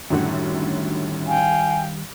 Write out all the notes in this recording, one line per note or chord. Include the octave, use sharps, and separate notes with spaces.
F#2 A2 D3 D#3 G3 F#5
F5 G5 G#5